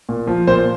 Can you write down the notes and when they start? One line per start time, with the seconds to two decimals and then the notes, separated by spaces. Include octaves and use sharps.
0.09 A#2
0.27 F3
0.47 A#2 C5